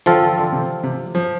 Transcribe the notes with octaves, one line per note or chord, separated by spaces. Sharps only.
D3 F3 C4 F4 A4
D3
D3
C3
C3
F3